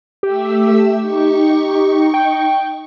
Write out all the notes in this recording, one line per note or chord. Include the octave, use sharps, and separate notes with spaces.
A3 G4 E5 E6
D#4 C#6
G5